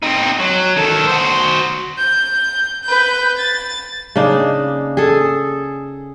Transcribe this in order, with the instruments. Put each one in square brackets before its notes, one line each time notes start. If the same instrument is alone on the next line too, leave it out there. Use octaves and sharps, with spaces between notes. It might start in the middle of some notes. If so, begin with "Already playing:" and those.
[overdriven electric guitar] C4 D#4
F#3
D#3 A4
F#4 C5
[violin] G6
B4 G6
A6
[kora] C#3 A#3 D4 D#4
G#4 A4